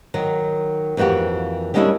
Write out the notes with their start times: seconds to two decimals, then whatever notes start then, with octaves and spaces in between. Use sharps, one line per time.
0.14 D#3 F#3
0.97 F2 E3 A#3 F#4 G4
1.74 G3 G#3 A#3 C#4 D4 E4